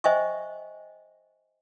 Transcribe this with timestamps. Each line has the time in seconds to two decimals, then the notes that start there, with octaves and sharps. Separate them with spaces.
0.04 C5 D#5 E5 G5 G#5 C#6